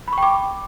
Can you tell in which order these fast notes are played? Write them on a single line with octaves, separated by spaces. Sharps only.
B5 C#6 G5 D6